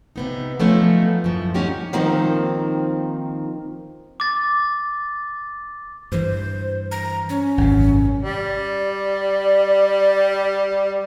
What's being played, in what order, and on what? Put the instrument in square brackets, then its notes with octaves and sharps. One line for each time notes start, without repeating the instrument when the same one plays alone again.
[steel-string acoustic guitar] C3 B3 D#4
F3 F#3 A3 B3 C#4 D#4
F#2 A2 F3
C#4 D#4 F#4 G4
D#3 F3 A#3 C4 D#4
[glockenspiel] D6 A6
[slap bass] G2 E3 [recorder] C5
[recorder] A#5
C#4
[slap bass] G#1 F#2 C3
[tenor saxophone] G3 [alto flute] D5